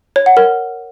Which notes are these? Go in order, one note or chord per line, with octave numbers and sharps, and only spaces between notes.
C#5
F#5
A#4